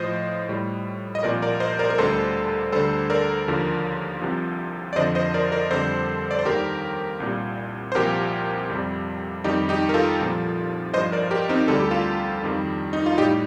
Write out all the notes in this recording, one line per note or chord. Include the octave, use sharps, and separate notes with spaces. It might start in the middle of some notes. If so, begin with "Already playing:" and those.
Already playing: A2 F3 C5 D#5
A2 G3
D#5
C2 A#2 F3 A#4 D5
A#4 D5
C5 D#5
A#4 D5
A#4
D2 D3 G3 A4 C5
D2 D3 G3 A4 C5
A#4 D5
D#2 D3 F3
C2 C3 F3
D5
F2 D3 F3 C5 D#5
C5 D#5
A#4 D5
A#4 D5
F2 D3 G3 A4 C5
D5
C5
D#2 D#3 G3 G4 A#4
C2 A#2 G3
C5
C2 A#2 F3 G4 A#4
F2 C3 G3
F2 D#3 G3 D#4 G4
D#4 G4
A#4
F4 A4
C2 A#2 F3
G2 F3 C5 D#5
A#4 D5
G4 A#4
C4 D#4
D2 D3 G3 A4
G4
F4 A4
F2 D#3 G3
D#4
F4
A2 G3 D#4 G4